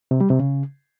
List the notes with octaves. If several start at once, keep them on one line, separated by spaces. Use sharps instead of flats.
C3
G3
C3
C#3